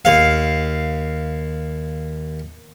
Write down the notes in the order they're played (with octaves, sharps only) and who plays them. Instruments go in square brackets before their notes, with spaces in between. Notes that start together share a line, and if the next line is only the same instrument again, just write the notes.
[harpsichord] D#2 F5